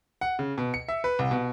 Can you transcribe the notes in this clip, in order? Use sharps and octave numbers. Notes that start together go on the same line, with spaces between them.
F#5
C#3
B2
C#7
E5
B4
C2
B2